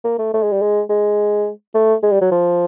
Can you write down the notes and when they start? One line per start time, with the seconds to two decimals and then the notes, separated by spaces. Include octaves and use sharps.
0.04 A#3
0.19 A3
0.34 A3
0.43 G#3
0.52 G3
0.62 G#3
0.90 G#3
1.75 A3
2.03 G#3
2.12 G3
2.21 F#3
2.31 F3